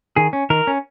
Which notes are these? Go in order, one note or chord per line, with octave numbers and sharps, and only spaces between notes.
D#3 G#4
C#4
D#3 A#4
C#4